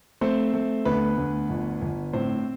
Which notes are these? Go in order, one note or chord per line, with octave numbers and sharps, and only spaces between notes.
A3 C4 C5
A3
D2 B3 B4
D2
G1
G1
A2 C4 C5